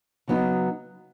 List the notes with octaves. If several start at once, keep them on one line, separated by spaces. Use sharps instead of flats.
C#3 F#3 B3 D#4